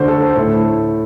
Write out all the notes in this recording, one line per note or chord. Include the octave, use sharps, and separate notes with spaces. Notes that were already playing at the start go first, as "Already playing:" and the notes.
Already playing: D2 D3 A3 D4 C5
A4
C5
A2 A3 E4